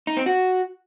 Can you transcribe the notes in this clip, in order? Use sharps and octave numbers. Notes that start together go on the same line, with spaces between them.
D#4
C4
F#4